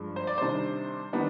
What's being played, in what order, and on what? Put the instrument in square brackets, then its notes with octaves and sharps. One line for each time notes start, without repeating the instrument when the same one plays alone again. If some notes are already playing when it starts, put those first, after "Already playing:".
Already playing: [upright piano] G2 F3 G#3
C5
D5
C3 D#3 G3 D4 C5
D#3 G3 B3 D4